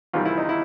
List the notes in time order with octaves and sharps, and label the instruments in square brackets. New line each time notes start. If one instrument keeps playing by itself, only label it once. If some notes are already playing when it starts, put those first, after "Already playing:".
[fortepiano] E2 C3 D#3 G3 F4
E4
D#4
E4